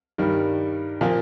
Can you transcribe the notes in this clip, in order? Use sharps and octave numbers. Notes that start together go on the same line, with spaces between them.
G2 D#3 G3
A#2 F3 A#3